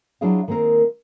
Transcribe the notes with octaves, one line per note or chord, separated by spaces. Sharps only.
F#3 D4 E4 F4 G#4 F5
D#3 G#3 A#3 C4 A#4